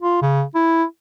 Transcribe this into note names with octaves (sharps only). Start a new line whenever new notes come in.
F4
C#3
E4